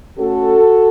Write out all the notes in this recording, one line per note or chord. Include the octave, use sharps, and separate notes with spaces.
A3 C#4 F#4 A4